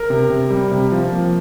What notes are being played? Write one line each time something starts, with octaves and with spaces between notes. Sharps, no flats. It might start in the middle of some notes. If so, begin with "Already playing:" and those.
Already playing: A#4
C3
C3
G3
C3
F3
A#3